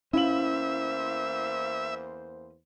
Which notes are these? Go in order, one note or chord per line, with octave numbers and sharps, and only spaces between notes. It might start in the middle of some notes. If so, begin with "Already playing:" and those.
E2 A#3 C#4 E4 C5 E5 F5 F#7